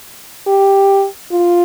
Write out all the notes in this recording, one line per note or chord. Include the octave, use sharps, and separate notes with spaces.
G4
F4